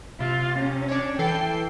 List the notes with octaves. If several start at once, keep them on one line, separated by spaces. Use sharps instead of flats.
C3 F4
C3 C#4
D4 C#5
E3 A4 G5 C7